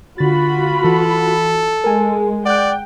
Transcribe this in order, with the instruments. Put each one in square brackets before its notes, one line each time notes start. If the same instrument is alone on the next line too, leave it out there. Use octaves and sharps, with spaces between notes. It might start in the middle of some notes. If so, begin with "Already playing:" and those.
[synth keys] D3 A6 [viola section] F4 F#4 B5
[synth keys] E3 [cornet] A4
[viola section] G#3 [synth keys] A#4 G#5
[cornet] D5 [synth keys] F#5 F#6 [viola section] G5